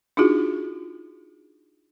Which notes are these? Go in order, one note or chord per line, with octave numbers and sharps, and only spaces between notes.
D4 D#4 F4 F#4 G#4